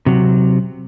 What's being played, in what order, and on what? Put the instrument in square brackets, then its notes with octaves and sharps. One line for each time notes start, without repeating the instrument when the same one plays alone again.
[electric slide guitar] C3 F#3